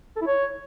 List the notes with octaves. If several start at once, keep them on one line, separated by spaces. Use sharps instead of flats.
A4
E4
C#5